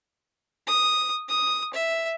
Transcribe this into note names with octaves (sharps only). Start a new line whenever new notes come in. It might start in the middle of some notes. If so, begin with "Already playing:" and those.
D#6
D#6
E5